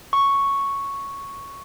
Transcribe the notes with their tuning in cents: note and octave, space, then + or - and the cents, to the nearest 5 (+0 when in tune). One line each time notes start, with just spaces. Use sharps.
C#6 +0